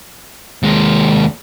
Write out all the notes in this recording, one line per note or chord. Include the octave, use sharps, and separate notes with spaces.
D#2 G#3